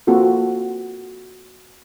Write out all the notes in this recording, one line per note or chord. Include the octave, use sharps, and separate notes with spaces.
A#3 C4 F4 F#4 A4